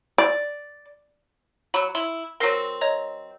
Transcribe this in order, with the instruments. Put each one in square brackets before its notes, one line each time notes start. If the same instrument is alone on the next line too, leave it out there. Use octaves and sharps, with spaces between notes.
[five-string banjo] D5
[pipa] F#3 [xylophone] B5 E6
[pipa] E4 [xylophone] C6
[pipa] F#3 C4 [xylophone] A#4 A#6 C7
[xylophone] C#5 D#5 A#5